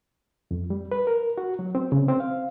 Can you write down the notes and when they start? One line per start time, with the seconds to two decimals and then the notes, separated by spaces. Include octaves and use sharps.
0.51 F2
0.70 G3
0.92 B4
1.07 A#4
1.38 F#4
1.59 F#3
1.75 C4
1.92 C#3
2.08 C4
2.20 F5